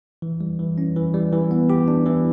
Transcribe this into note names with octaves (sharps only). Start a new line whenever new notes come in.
E3
G3
E3
C#4
E3
G3
E3
B3
G4
D4
E3